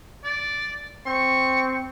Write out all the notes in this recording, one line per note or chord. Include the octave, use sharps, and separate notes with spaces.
D5
C4 C#6